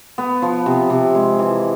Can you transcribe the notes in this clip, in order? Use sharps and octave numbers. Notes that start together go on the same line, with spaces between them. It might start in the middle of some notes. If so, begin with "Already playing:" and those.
B3
F3
C3
C3
G#3
E3